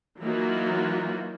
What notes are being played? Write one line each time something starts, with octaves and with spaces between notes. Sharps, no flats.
E3 F#3 A#3 D#4 F4 F#4